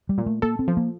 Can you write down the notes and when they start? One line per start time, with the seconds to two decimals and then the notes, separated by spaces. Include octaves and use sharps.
0.09 G3
0.18 A#2
0.26 A3
0.42 A#3 A4
0.59 C4
0.68 F3
0.77 A#3